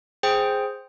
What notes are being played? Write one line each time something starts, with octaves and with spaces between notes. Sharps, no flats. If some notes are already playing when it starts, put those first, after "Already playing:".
G#4 C5 G5